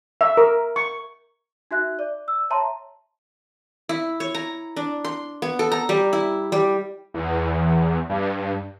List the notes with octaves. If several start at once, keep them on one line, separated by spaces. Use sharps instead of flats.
E5
A#4
C#6
D#4 F#4 E5 F#6
D5
E6
C#5 E5 A5 A#5 C6
E4
C#5
A#5
D4
C6
B3
A4
A#5
G3
E4
G3
E2
G2